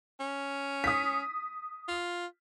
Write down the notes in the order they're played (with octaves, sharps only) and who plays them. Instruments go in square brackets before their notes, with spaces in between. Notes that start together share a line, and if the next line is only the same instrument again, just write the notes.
[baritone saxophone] C#4
[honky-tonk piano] D#6 B6
[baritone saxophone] F4